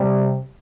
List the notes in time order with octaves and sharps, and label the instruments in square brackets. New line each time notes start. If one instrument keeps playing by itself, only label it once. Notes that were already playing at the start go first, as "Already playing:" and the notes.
Already playing: [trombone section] C3 G3